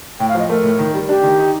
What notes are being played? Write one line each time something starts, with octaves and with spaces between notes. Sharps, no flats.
A2 G5
F5
F3 D#5
A3 A#4
A2
D#3
G3
D4 G4
D#3
D#4